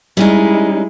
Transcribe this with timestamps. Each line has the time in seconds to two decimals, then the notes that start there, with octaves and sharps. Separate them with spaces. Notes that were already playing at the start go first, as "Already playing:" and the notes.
0.17 G3 G#3 C#4 D#4 E4